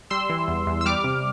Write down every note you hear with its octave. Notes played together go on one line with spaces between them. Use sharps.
G3 C6 E6
E3
E2
E2
E6
G3 D6 F6
C3